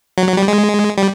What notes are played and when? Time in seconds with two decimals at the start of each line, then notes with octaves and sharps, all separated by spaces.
0.18 F#3
0.28 F#3
0.37 G3
0.48 G#3
0.98 G3